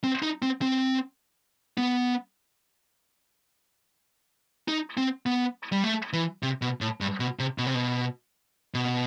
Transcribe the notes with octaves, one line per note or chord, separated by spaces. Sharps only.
C4
D#4
C4
C4
B3
D#4
C4
B3
G3
A3
E3
C3
B2
A2
G2
B2
C3
B2
C3
B2
B2